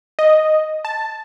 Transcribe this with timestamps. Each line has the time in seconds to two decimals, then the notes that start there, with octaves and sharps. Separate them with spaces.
0.19 D#5
0.85 A5